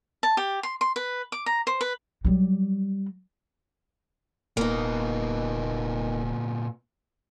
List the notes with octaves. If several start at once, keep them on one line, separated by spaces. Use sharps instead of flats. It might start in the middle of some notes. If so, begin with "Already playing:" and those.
A5
G4
C6
C6
B4
D6
A#5
C5
B4
F#3 G3
D#1 A#2 A#3 B3 D#4